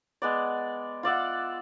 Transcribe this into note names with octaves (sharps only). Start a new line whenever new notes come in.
G#3 B3 D5
F4 D5 E5 F#5